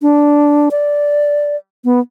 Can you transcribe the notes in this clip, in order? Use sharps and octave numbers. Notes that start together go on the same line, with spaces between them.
D4
D5
B3